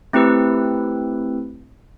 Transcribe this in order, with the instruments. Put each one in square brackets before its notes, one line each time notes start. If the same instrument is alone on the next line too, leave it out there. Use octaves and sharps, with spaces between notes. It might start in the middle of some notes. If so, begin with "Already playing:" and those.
[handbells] A3 C4 E4 G4 B4 E6